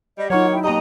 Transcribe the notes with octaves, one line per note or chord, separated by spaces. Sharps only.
G3 D#5
F#3 A#3 D#4 F4 C#5 F#5
E4 G5
F2 B2 A#3 G4 D#5 A#5